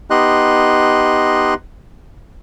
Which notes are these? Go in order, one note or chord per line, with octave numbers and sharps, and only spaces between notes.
B3 D#4 G4 D#5 C6 F#6